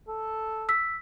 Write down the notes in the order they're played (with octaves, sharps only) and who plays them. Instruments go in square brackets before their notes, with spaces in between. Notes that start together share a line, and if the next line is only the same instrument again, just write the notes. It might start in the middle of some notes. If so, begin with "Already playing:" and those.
[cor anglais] A4
[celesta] E6 B6